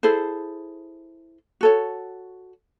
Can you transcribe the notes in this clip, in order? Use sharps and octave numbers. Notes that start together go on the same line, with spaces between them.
E4 G#4 A4 C5
F#4 A4 C#5